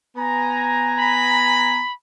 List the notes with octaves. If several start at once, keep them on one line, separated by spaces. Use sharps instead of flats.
B3 G#5 A#5
B5